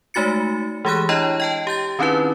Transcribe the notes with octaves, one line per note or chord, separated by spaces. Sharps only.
G#3 A3 D#4 F#4 A6 C#7
E3 G#3 G4 G#4 B5 F#6
D4 E4 C#5 D#5 A#5
D#5 G5 A5
G4 G6 A6
D#3 C4 C#4 D#4 E4 B4